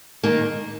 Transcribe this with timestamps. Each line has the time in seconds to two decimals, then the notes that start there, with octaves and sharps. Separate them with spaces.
0.23 D#3 A#3 D#4